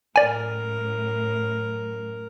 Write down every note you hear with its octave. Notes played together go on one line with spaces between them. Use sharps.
F#2 A2 A#4 D5 G#5